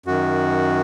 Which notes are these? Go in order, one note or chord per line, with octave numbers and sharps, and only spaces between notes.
F#2 D#3 F#4